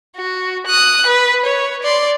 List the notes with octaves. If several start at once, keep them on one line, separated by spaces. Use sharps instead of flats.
F#4
D#6 F#6
B4
C#5
D5 C6